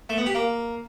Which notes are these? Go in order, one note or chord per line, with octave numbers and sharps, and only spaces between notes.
A3
B3
G4
A#3